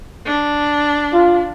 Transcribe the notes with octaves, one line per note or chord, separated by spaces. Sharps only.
D4
F4